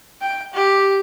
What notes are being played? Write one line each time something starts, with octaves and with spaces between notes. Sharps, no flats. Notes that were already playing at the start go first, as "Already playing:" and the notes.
G5
G4